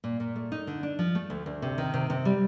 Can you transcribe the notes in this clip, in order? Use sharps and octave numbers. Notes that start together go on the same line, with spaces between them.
A#2
A#2
A3
D#4
D3
D4
F3
A3
D2
D2
C3
D#3
C3
C3
G3